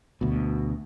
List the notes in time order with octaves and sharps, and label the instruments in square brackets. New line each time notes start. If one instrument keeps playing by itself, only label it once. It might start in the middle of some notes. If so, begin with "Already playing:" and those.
[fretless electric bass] D2 B2